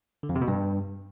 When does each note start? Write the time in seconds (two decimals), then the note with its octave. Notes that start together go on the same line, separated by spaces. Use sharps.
0.23 D3
0.29 F2
0.35 C3
0.42 B2
0.48 G2